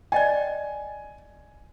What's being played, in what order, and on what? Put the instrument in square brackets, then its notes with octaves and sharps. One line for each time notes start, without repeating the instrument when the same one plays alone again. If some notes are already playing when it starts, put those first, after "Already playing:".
[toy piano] D5 D#5 G5 [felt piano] G#5